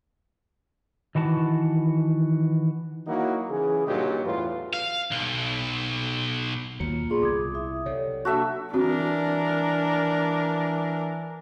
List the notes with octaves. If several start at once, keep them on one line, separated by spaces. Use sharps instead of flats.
D#3 E3 F#4 A5
F#3 A#3 D#4 E4 F#4
C#3 E3 G#4
G2 A#2 F#3 D#4 G4
E2 A2 F4 B4
F5
B1
D#2 B2 F#3 A#3 F4 C#7
G2 A#2 B3 F4 G#4 D5 C6
C2 D6 D#6 G#6
E4 E5 D#6
C3 F#3 A4 C#5 D5
A#3 D4 F#4 A4 E5
E3 C4 D4 F#4 A#4